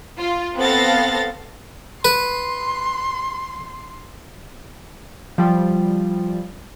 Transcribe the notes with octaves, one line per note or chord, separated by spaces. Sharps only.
F4
B3 C4 A4 F5 A6 A#6
B4 C6
F3 G3